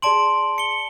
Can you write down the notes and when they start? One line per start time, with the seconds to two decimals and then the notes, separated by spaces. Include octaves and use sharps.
0.02 G#4 D5 A5 C6 D7 F#7
0.58 C#7 G7